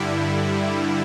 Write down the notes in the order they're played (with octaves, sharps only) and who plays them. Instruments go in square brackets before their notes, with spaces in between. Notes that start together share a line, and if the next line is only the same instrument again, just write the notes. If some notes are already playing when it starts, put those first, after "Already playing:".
Already playing: [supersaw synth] G2 D3 G3 E4